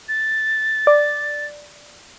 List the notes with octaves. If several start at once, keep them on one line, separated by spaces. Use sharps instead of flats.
A6
D5